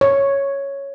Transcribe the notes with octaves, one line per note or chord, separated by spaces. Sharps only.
C#5